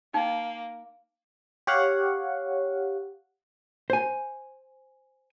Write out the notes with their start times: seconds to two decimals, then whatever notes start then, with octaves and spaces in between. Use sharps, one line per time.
0.14 A#3 D#4 G5
1.67 G4 C#5 F5 F#5
3.90 C5 G#5